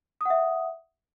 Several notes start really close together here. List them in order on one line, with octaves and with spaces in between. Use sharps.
D#6 F#5 E5